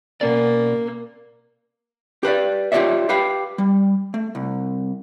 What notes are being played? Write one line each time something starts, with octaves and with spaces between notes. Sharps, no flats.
B2 A#3 C#4 D5
G4 B4 C5 D5
F4 G4 G#4 C#5 D5 E5
G4 B4 F5 G5 B5
G3
A3
C2